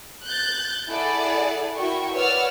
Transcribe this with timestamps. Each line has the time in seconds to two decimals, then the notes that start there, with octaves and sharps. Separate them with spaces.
0.25 F#6 G6 A6
0.88 E4 G#4 A4 D5 F#5
1.76 E4 F#4 A#4 G5 C#6
2.13 B4 C#5 D5 F#5 E6 F6